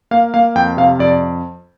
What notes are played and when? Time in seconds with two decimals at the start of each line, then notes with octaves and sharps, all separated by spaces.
0.11 A#3 F5
0.34 A#3 F5
0.55 F2 G5
0.77 C3 F5
0.99 F2 D5